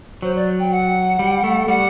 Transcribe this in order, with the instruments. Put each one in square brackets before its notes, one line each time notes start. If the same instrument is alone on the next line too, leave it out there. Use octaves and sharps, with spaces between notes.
[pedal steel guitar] F#3 [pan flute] C5
[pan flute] D5
G5
F#5
[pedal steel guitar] G3
A3
[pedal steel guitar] G3 [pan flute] F#5